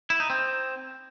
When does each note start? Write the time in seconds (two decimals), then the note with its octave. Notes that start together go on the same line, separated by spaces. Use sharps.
0.10 E4
0.20 D#4
0.30 C4